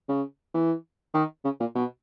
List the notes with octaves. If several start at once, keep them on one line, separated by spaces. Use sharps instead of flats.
C#3
E3
D#3
C#3
A#2
B2